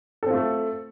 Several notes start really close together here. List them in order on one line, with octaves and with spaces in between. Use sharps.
A4 C4 F4 A3